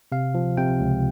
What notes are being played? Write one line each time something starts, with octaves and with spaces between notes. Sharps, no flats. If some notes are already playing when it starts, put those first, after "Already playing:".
C3 F5
F3
C3 G5
C#2